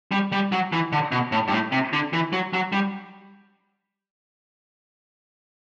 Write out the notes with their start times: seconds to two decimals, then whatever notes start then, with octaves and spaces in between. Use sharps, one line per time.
0.12 G3
0.32 G3
0.52 F#3
0.72 E3
0.92 D3
1.12 B2
1.32 A2
1.48 G2
1.52 A2
1.72 C3
1.93 D3
2.13 E3
2.33 F#3
2.53 F#3
2.72 G3